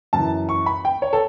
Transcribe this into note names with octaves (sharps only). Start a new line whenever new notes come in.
F#2 E3 A5
C#6
B5
G5
C#5
A4